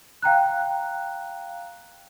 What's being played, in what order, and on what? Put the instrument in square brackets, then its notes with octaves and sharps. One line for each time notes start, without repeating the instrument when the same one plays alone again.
[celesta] F5 G5 A#5 F#6